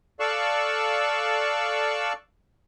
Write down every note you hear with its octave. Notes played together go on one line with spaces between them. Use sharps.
A4 D5 F5 C#6 E6 F#6